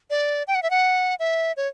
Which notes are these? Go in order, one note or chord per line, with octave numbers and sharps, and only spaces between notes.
D5
G5
F#5
E5
F#5
E5
C#5